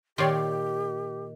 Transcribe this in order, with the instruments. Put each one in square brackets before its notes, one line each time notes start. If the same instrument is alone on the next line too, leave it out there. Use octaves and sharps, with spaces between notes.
[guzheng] A#2 D#3 [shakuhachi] G4 [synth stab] C#5 D5 C6